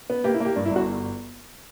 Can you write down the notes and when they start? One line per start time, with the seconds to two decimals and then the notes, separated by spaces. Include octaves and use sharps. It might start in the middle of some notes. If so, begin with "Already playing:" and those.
0.10 B3
0.24 A#3 G4
0.34 E4
0.40 A#3 G4
0.56 G2 D4
0.66 E4
0.71 G1
0.76 F#4